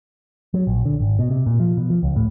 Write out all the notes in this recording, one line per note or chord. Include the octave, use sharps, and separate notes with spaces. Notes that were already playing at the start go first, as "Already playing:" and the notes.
F#3
A#1
D3
G#1
B2
C3
A#2
F3
B2
F3
C#2
A2